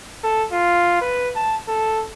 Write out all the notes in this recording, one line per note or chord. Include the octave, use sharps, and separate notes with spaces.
A4
F4
B4
A5
A4